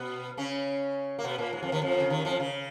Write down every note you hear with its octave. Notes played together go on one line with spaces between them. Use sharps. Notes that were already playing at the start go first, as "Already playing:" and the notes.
Already playing: B2 B3
C#3 C#4
A#3
B2 B3
A#2 A#3
G#2 G#3
F2 F3
D#2 D#3
F2 F3
C#3
D#2 D#3
F2 F3
C#3